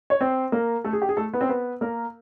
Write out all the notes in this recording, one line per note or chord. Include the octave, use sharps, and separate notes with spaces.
C#5
C4 C5
A#3 A#4
A3 A4
G#4
G4
G#4
A3 A4
B3 B4
C4 C5
B3 B4
A#3 A#4